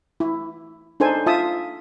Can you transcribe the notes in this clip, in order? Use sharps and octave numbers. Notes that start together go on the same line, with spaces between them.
E4
D4 D#4 A4 C5 G#5
F4 E5 A5 D#6